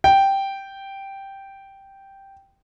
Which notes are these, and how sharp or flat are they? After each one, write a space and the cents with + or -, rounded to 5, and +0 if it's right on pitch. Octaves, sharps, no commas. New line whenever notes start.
G5 -5